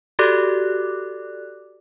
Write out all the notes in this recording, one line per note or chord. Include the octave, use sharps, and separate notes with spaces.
F#4 G4 A4 D5 D6 F#6